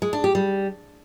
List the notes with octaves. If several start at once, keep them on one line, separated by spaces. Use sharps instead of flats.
G#3
D4
G4
G3